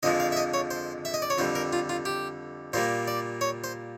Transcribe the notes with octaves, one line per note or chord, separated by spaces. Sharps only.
F2 D3 F3 G#3 D#5
F5
E5
D#5
C#5
C5
E5
D#5
D5
C#5
F2 D3 G3 C5
A#4
F4
F4
G4
A#2 G3 A#3 C5
D5
C#5
C5